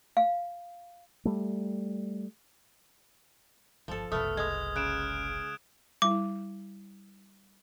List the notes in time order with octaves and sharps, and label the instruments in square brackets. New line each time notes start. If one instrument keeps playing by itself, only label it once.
[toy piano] F5
[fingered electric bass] G3 A3
[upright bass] G1 E2 [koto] F3 A4
[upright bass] F#1 C2 [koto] A3 B3 [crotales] D#6 F6
[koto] G#3 [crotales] D#6 G#6
[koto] C#3 [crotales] F#6 D7 E7
[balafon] G3 E4 [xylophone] D6